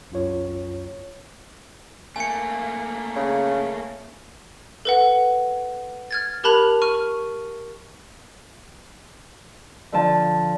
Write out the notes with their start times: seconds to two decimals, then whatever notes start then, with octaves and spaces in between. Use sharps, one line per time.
0.10 C2 F#2 F4 C#5
2.16 A3 A#3 G#5 C#7
3.16 C#3
4.85 A4 B4 F#5
6.11 F6 G#6 A6
6.44 G4 A#4 A5 B5 F#6 F7
6.82 C#6 F6 D#7
9.92 D3 F3 A5